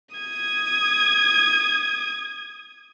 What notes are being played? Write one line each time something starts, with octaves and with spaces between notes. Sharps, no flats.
D#6 G#6